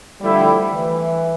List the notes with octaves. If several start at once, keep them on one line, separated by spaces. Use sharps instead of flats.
D3 F3 G3 A3 E4
E3